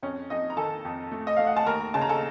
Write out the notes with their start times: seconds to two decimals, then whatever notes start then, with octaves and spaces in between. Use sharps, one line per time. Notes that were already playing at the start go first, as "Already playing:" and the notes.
0.02 F2 C#4 C#5
0.30 F2 D#4 D#5
0.50 A#5
0.57 D#3 A4 A5
0.85 F2
1.12 A3
1.27 D#5
1.37 A3 F5
1.47 F#5
1.57 A5
1.66 D#2 A#4 A#5
1.94 C#3 A5
2.02 A#5
2.09 A4 A5